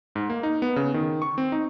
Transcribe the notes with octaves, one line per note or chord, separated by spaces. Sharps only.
G#2
A#3
D#4
B3
C#3
D#3
C#6
C4
D#4